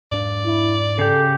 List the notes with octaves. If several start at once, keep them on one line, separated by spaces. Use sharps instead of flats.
G#2 D4 D5
E4
C#3 G4 A4